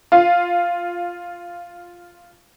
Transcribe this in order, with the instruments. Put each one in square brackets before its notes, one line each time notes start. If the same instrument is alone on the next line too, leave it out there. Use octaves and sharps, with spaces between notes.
[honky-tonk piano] F4 F5